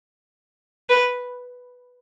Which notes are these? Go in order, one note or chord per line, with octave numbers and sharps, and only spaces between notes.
B4